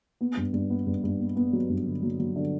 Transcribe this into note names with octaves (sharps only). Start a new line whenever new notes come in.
B3
G2
G2
B3
G2
G2
B3
B3
F#3
G2
D3
F#3
F#3
D3